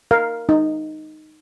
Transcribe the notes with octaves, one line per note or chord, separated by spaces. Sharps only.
A#4 F5
D#4